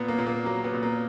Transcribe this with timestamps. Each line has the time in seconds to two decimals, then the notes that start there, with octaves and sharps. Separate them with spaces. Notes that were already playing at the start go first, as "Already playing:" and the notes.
Already playing: A#2 B3
0.08 A#3
0.18 A#2
0.27 A#3
0.45 F#3 A#3
0.64 B3
0.73 A#2
0.83 A#3